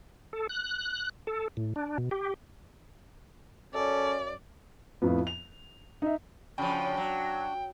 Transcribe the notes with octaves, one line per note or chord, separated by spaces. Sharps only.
A4
F#6
A4
A2
D4
B2
G4
F#2 C#4 A4 D5
F2 A2 F3 B3
F7
D#4 E5
C#3 F3 D4 F#4 G5
F#3